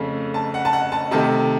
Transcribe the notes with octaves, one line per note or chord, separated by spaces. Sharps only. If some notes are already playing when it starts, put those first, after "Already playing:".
Already playing: F2 C#3 A3
A5
F#5
A5
F#5
A5
C3 D#3 A3 A5